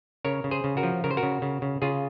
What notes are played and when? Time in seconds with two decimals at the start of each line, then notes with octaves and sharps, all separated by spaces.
0.25 C#3 A#4 C#5
0.44 C#3
0.51 G#4 C5
0.64 C#3
0.77 F#4 A#4
0.83 F3
1.04 C#3 A#4
1.11 C5
1.17 F#4 A#4
1.23 C#3
1.42 C#3
1.62 C#3
1.82 C#3 F4 G#4